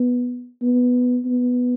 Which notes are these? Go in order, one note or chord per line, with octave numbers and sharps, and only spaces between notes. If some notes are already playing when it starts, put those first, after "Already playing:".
Already playing: B3
B3
B3